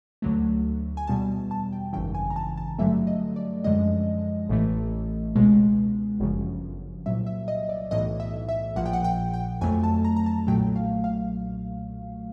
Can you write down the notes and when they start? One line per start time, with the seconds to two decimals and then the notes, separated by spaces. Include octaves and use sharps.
0.22 D2 D3 F#3 A3
0.97 G#5
1.07 E2 B2 G3 A5
1.51 A5
1.72 G5
1.93 G#1 F#2 C#3 E3 G5
2.15 G#5
2.30 A#5
2.36 A5
2.57 A5
2.79 G2 D3 F#3 A3 E5
3.07 D#5
3.36 D5
3.64 F#2 D3 F3 G#3 D#5
4.49 A1 A2 E3 A3
5.35 C#2 B2 G#3
6.20 G1 F#2 C#3 F3
7.06 C2 A#2 F#3 E5
7.26 E5
7.48 D#5
7.69 D5
7.91 B1 A2 E3 D#5
8.20 E5
8.49 E5
8.76 A#1 A#2 F3 F#5
8.86 G5
8.93 F#5
9.04 G5
9.34 G5
9.61 F2 D3 F#3 A3 G#5
9.83 A5
10.05 A#5
10.16 A#5
10.26 A5
10.47 B1 A#2 F#3 A3 G5
10.76 F5
11.04 F5